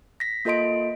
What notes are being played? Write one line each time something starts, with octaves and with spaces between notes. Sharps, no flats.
A#6 B6
A#3 F4 A4 D#5 C6 D7